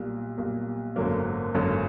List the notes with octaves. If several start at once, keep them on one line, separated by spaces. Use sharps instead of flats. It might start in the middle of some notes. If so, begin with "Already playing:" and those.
Already playing: B1 A#2 G3
B1 A#2 G3
G#1 F#2 D3 F#3 A#3
G#1 F#2 D3 F#3 A#3